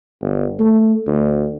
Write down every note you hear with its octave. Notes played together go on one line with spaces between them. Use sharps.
G1
A3
D2